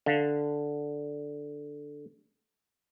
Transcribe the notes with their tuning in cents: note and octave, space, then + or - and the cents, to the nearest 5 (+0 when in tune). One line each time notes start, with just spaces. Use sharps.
D3 +0 F5 +0